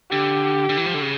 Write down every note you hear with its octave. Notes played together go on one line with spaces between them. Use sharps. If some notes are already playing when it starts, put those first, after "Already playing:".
D3 G4
D3
E3
F3
D3
C#3